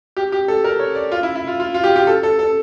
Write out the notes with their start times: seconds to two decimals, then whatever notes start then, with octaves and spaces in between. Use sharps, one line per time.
0.17 G4
0.32 G4
0.48 A4
0.64 A#4
0.79 C#5
0.95 D5
1.12 F4
1.23 E4
1.35 E4
1.47 F4
1.60 F4
1.74 F4
1.84 G4
1.96 G4
2.07 A4
2.23 A4
2.39 A4